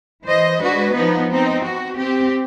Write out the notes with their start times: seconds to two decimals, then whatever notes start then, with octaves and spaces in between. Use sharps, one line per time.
0.23 E3 C5 D#5
0.60 G#3 D4 F#4 B4
0.95 F3 B3 D#4
1.32 C4 D#4
1.62 F#4
1.98 C4 G4